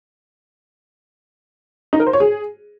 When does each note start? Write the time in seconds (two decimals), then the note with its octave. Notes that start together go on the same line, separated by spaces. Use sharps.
1.93 D#4
2.00 A#4
2.07 C5
2.13 C#5
2.20 G#4